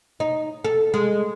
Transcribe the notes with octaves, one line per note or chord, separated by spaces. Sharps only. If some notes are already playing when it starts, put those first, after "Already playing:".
D#4
A4
G#3